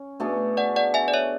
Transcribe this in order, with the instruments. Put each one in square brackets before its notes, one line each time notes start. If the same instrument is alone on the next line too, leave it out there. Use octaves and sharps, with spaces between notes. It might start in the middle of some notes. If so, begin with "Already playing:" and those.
Already playing: [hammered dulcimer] C#4
B2 A3 D4 G#4
[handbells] D5 F#5
D5 F#5
E5 G#5
D5
C#5 E5